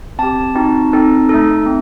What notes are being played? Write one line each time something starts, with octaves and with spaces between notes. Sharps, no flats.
C4 G4 A5
C4 D#4 F#4
C4 D#4 A4
A3 D#4 A4
C4